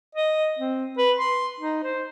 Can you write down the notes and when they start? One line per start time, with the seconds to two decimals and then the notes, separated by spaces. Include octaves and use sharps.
0.15 D#5
0.59 C4
0.98 B4
1.19 C6
1.60 D#4
1.83 C5